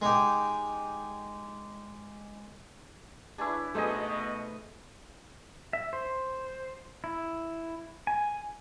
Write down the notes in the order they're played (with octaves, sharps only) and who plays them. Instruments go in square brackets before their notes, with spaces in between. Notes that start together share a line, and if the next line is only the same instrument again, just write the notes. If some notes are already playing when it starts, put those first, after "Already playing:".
[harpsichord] G#3 D#4 G4
[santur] D4 E4 [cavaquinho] G#4 B4 C#5
[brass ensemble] B2 [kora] A3 G#4 [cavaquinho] D#4 B4 D#6 [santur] C5 D#5
[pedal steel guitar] E5
C5
E4
G#5